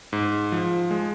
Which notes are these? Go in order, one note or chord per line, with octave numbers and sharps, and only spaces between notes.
G#2
F3
G#3